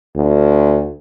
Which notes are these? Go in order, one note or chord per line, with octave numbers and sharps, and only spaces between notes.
D2